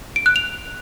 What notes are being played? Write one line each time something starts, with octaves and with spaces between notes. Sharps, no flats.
D7
F#6
F7